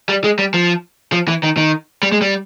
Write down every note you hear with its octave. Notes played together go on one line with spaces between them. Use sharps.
G3
G#3
G3
F3
F3
E3
D#3
D#3
G3
G#3
G3